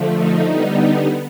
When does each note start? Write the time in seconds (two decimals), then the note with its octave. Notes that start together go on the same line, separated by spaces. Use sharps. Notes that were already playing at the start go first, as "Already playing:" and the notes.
Already playing: D3 F3 A3
0.16 D#4
0.46 D3 G3 B3